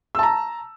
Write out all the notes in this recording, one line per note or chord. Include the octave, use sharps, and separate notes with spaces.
A5 A#5 E6